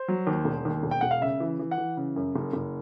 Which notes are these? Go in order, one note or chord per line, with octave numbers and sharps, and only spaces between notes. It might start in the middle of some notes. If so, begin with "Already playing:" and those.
Already playing: C5
F#3
D#2
E1
D#2
E1
G5
E1 F#5
F5
C#3 E5
E3
E3
F#5
E3
C#3
F#2
F#1
F#1